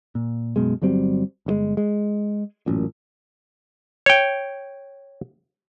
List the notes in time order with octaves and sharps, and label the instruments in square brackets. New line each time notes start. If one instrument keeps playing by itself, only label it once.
[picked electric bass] A#2
F#2 B2 G#3
G1 F#3 G3 C4
G1 C#3 G#3
G#3
A1 F#2 A#2
[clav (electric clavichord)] C#5 G5